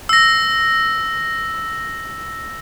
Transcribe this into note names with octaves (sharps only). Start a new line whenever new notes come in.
E6 A#6